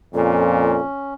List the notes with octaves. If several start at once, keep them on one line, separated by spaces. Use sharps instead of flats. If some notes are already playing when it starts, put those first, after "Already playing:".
F2 A#2 C#4 A4